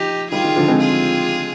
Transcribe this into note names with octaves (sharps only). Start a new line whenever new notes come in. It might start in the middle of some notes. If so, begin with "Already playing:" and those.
Already playing: F3 D#4 G4
D#3 G3 F4 G#4
D#3
D3 F3
G#3 C4
F4 G#4